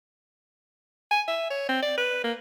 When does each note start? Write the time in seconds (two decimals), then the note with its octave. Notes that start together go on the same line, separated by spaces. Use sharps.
1.11 G#5
1.28 E5
1.50 C#5
1.69 C4
1.82 D5
1.98 B4
2.24 A#3